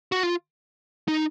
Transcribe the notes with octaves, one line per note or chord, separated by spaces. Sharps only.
F#4
F4
D#4